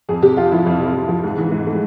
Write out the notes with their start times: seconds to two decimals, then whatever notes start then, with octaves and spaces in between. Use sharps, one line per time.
0.09 F2 G#4
0.22 C3 G4
0.37 F2 F4
0.52 F3 E4
0.66 F2
0.80 C3
0.95 F2
1.09 F3
1.24 G#2
1.38 E3
1.52 G#2
1.66 A3